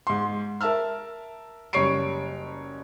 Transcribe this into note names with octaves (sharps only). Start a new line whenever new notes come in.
G#2 C6
A#4 E5 A5 E6 F6
F#1 G3 C#5 C#6 C7 D7